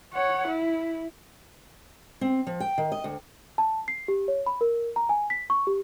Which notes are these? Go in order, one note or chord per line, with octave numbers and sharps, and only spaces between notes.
C#5 F#5
E4
C4
F3
G5
D#3
D#5
D2
A5
C7
G4
C#5
B5
A#4
A#5
G#5
B6
C#6
G4